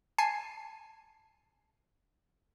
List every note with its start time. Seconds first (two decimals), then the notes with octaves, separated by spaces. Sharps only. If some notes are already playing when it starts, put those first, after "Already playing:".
0.18 G#5 A5 C7